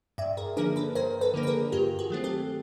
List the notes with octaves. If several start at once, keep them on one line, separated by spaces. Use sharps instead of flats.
G2 D5 E5
G#4 A#4
D3 F3 A#3 D4 G#4 A#4
A4 B4
G2 A#4 C5
A4 B4
D3 F3 A#3 D4
B4
G#4 A#4
G2 F4 G4
F#4 G#4
D#3 F#3 A3 C4
G4 A4